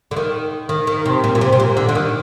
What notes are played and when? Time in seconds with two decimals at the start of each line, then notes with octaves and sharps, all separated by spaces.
0.11 D3
0.16 D#3
0.69 D#3
0.87 D#3
1.06 C3
1.24 A#2
1.35 A#2
1.41 C3
1.52 C3
1.60 A#2
1.77 D3
1.89 D3
1.95 D#3